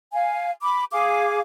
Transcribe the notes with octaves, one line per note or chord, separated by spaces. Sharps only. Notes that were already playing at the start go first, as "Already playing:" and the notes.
F5 G#5
B5 D6
G#4 F5 D6